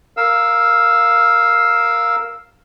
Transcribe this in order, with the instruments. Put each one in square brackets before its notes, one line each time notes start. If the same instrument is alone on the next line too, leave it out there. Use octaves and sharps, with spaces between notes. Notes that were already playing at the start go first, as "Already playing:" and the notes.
[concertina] A#4 F5 E6